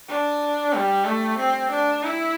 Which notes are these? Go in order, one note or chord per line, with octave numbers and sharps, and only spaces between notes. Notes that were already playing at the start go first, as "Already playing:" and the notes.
D4
G3
A3
C4
D4
E4